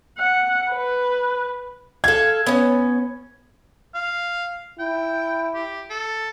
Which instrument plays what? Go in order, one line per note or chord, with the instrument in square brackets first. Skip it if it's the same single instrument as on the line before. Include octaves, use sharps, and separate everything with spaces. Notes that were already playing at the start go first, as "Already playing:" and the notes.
[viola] F#5
B4
[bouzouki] A4 F5 [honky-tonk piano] G#6
[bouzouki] B3 C#4
[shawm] F5
[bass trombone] E4 [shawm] G5
[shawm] G4
A4